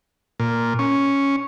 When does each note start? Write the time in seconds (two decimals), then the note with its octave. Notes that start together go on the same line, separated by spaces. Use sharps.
0.40 A#2
0.79 C#4